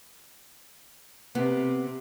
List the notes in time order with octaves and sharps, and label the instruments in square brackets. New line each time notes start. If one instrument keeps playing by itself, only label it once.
[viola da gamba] C3 [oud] B3